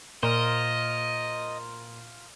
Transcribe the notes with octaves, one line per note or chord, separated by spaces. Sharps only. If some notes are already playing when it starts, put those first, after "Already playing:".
A#2 F4 A#4 C5 D#5